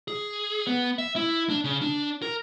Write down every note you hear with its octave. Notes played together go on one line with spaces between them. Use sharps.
G#4
B3
E5
E4
D4
C#3
D4
A#4